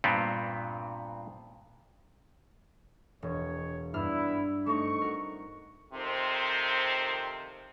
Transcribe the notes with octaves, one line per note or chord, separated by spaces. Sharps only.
G2 A#2 B3 C4
E1 C#5
G2 B3 D4 E4 F6
A3 C4 D#4 C#6
F#4 A#4
F2 C3 D#3 C4 C5